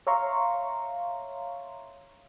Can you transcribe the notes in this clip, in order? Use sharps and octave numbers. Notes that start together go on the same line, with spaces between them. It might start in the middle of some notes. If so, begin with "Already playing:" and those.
C#5 E5 F5 A#5 C6 C#6